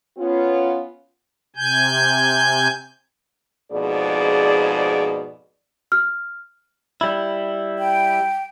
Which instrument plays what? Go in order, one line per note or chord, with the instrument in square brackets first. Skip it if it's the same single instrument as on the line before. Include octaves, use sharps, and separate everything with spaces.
[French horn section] B3 C#4 F4
[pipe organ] C3 G#5 G6
[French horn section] F2 G#2 B2 G#4 D5
[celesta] F6
[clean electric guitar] G3 E4
[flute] G5